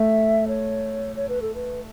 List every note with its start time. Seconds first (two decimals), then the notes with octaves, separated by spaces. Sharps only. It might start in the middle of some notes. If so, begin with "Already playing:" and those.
Already playing: A3 E5
0.48 C#5
1.16 C#5
1.29 B4
1.42 A4
1.55 B4